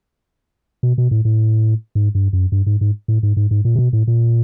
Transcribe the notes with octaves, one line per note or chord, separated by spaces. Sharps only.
B2
B2
A2
A2
G#2
G2
F#2
G2
G#2
G#2
A2
G#2
G#2
G#2
A#2
C3
B2
A2
A#2